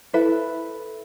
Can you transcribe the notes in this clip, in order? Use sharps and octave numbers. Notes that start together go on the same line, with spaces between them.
E4 A4 B4 E5